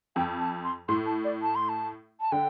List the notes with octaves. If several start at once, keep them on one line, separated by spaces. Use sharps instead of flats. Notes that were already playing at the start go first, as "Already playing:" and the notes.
F2 G5
A5
C6
A2 C6
A5
D5
A5
C6
A5
A5
D3 G5